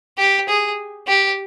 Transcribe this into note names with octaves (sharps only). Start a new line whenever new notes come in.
G4
G#4
G4